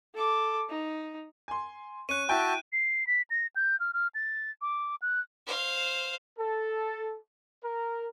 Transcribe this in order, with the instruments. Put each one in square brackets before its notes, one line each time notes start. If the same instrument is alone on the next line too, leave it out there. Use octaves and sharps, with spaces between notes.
[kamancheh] A4 D6
D#4
[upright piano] G#5 C6
[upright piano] C#4 [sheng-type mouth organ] C#6 [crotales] F#6 D#7
[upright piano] E4 G5 [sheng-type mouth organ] F#4 E5 A5
[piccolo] C7
B6
A#6
G6
F6
F6
A6
D6
F#6
[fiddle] C5 F5
[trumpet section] A4
A#4